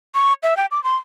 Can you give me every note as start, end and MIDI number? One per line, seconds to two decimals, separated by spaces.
0.15 0.33 85
0.43 0.57 76
0.57 0.66 79
0.71 0.82 86
0.84 0.96 84